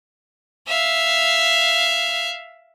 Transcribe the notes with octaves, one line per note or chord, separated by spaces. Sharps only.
E5 F5